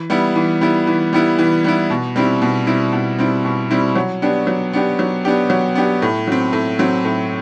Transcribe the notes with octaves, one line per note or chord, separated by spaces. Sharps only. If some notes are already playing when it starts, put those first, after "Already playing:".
Already playing: E3
G3 B3 E4
E3
G3 B3 E4
E3
G3 B3 E4
E3
G3 B3 E4
B2
G3 C4 E4
B2
G3 C4 E4
B2
G3 C4 E4
B2
G3 C4 E4
F#3
B3 D4 G4
F#3
B3 D4 G4
F#3
B3 D4 G4
F#3
B3 D4 G4
A2
F#3 C4
A2
F#3 C4
A2